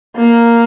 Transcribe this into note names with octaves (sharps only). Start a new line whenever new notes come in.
A#3